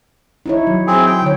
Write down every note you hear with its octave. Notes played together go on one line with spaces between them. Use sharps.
D#4 E4 C#5
F#3
C4 G#4
G5
D3 C#5